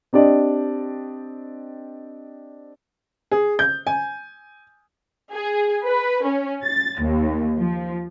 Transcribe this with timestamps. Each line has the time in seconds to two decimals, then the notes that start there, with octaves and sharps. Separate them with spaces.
0.13 C4 D4 G4 D5 D#5
3.31 G#4
3.59 G6
3.87 G#5
5.31 G#4
5.84 B4
6.25 C#4
6.64 A6
7.03 D#2
7.57 F3